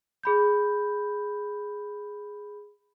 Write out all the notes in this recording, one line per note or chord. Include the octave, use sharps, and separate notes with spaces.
G#4 B5 G6